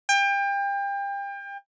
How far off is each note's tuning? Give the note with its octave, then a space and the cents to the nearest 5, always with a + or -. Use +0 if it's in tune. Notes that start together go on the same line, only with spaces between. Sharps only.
G5 +30